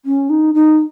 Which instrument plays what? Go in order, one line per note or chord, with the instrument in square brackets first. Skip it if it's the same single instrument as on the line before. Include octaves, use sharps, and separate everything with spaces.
[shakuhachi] C#4
D#4
D#4